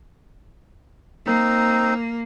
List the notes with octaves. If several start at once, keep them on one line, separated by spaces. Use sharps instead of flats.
A#3 C4 D#4